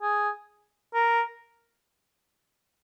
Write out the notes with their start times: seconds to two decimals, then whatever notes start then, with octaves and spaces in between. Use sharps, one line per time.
0.02 G#4
0.94 A#4